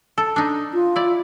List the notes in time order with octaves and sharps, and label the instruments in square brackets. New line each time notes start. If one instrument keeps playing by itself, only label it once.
[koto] A4
D4 D#4
[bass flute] F4
[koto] E4 D5